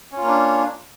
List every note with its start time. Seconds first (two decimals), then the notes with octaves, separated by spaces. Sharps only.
0.12 C#4
0.17 F4
0.22 A#3
0.27 D4